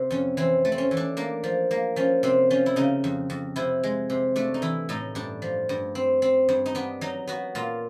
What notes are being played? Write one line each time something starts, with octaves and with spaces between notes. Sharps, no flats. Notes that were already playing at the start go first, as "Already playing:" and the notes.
Already playing: C3
F2 C#4
E3 C4
A3
C4
C#4
E3
D4
A#3 D4
F3
A#3
F3 C#4
C3 C4
F3 C#4
E4
C#3 D#4
F2
F2
C3 E4
G#3
C3
A3 D4
D#4
E3 E4
A2 D#4
G2 D4
F3
G2
C4
C4
G2
D#4
B3 D4
F#3 D#4
B3 F#4
A#2 F4